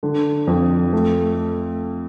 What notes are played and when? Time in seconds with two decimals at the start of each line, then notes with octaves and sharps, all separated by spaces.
0.03 D3
0.47 F2
0.93 A3